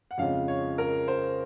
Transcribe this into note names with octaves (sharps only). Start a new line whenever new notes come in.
F#5
F2 C#3 F3 G#3 C#4 F5
C#5
A#4
C5